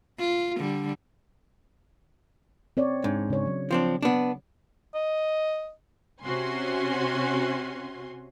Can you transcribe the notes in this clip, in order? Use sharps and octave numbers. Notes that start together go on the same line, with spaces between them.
F4
D3 G3
C4 C#5 D5
G#2 D4
C#3 C#5
F#3
F3 C4 D4
B3 D4
D#5
C3 C#4 F#4 G#5 C6